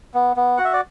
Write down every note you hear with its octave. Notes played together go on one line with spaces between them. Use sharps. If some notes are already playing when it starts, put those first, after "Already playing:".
B3
B3
F#4 F#5
E5
D5